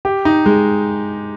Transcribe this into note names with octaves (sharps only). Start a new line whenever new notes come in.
G4
D#4
G#3